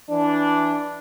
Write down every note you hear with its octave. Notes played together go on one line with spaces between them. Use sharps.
E3 D4